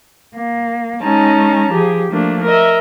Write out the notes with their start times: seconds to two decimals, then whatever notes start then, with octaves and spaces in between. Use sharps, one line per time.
0.34 A#3
1.02 G#3 C#4 D#4 A5 A#5
1.71 F3 G4 G#4
2.10 F3 A3 A#3 D4
2.45 A#4 D#5 E5